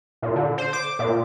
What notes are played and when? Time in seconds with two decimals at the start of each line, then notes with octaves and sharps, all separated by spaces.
0.22 A#2
0.36 D3
0.58 C5
0.73 D6
0.99 A#2